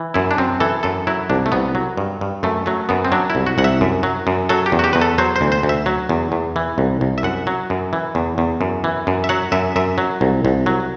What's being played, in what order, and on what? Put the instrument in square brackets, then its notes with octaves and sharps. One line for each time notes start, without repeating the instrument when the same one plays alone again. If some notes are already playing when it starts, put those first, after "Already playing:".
Already playing: [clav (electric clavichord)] E3
F#2 E4
D4
F#2 C4
E3 A4
F#2 A4
F#3 E4
C2 D4
A3
C2 B3
F#3
G2
G2
F#2 A3
F#3 A3
F#2 B3
C4
F#3 D4
E4
C2
F#4
C2 F#5
E5
F#2
F#3
F#2
F#3 A4
G4
E2
F#4
G4
E2 B4
A4
F#3 C5
C5
D2
C5
D2
E5
F#3
E2
E2
E3
C2
C2
E5
F#2 F#5
F#3
F#2
E3
E2
E2
F#2
E3
F#2
E5
F#3 F#5
F#2 E5
F#2 E5
F#3
C2
C2
F#3